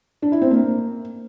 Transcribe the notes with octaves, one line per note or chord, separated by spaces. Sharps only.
D4
E4
C4
A#3